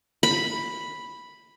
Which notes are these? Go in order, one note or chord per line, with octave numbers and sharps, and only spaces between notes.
B5